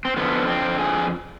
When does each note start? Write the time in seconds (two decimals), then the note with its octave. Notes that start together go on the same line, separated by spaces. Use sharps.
0.05 C4
0.17 F2 D3 F3 B3
0.48 C4
0.78 G#4